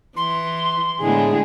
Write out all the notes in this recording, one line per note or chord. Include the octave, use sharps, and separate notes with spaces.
E3 C6
A2 D3 G#3 B3 G#4